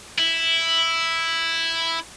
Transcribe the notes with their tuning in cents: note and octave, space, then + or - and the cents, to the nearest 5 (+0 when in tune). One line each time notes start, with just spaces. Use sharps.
E4 +0